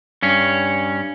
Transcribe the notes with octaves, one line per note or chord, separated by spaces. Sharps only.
G2 C#4